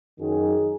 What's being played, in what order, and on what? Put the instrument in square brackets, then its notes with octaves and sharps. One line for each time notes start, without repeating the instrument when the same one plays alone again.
[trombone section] F#2 D#3 F#3 D#4 G#4